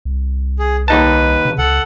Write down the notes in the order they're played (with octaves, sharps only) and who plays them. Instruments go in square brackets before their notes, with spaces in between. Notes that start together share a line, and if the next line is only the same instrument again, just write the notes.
[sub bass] C2
[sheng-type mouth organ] G#4
[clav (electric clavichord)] D#2 D#4 A5 [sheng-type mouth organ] B4
[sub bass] C3
[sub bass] C#2 [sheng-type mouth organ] A4 F#5